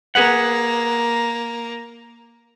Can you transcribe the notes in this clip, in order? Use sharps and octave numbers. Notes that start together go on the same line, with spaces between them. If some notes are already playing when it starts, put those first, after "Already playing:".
A#3 G#4 B4 F#5